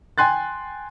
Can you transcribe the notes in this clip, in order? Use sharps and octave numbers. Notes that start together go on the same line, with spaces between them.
G5 G#5 C6 F#6 A6